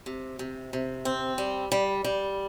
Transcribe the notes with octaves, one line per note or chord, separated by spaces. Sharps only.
C3
C3
C3
C4
G3
G3
G3